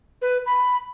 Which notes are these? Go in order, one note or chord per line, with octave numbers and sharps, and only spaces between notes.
B4
B5